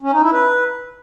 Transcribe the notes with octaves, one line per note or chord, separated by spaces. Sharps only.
C#4
D#4
E4
B4